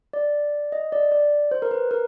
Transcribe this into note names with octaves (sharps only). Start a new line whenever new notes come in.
D5
D#5
D5
D5
C5
A#4
B4
A#4